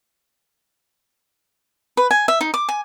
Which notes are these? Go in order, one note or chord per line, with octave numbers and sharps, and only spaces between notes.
B4
G#5
E5
D#4
D6
G#5